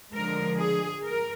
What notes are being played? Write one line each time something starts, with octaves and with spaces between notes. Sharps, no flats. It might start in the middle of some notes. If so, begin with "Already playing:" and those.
D3 F3 G#3 A#4
G#4
A#4